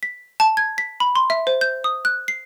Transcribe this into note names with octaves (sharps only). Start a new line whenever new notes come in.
B6
A5
G#6
B6
B5
C6
E5
C5
G6
D#6
F#6
C7